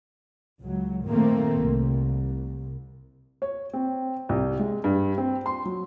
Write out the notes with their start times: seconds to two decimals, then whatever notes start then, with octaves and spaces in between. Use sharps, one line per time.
0.62 C#2 F#3
1.07 A#2 D#3 A3 A#3 C4
1.62 C2
3.42 C#5
3.73 C4
4.29 C2
4.59 G#3
4.84 G2
5.18 C4
5.46 C6
5.65 F#3